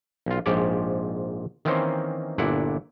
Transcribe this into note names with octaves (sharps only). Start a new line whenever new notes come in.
B1 F4
A#1 G#2 F3 G4 C#5 D5
D#3 E3 A#3 C4 C#4 C5
G1 A#2 D4 E4 F#5